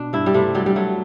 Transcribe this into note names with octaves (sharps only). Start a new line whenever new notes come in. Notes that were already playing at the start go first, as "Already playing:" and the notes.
Already playing: B2 D4
G2 E4
G3
C3 A3
F#3 G3
G3
F#3 A3